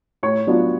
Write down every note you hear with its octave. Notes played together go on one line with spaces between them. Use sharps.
A2 C#5
F#3 B3 D4 F4